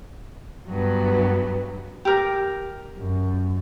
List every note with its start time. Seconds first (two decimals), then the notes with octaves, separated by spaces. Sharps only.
0.68 G2 F#3 B3
2.05 G4 A#4
2.98 F#2